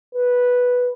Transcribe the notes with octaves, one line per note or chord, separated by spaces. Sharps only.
B4